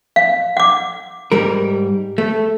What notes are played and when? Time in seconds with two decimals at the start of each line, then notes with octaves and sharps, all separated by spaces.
0.16 F5
0.57 F#5 D6
1.32 G#2 G3 A#4
2.18 A3